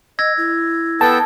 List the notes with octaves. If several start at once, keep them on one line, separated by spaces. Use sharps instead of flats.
D#5 E6 G#6 A#6
E4
B3 A4 G5 A5